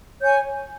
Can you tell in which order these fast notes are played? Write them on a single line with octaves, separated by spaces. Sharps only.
C#5 G6 G#5